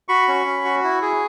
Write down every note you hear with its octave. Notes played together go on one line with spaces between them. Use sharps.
F#4 B5 C#6
C#4
C#4
F#4
E4
G#4